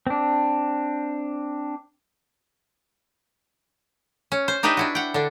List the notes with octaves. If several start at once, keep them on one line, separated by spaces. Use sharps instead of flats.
C4 D4
C#4
C5
D4 D#4 G4 B4 D#5 E5
D4 E4 F#4
F#5 G5
D3 D4